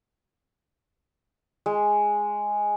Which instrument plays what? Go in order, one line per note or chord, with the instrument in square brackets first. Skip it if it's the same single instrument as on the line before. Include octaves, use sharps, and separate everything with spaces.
[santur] G#3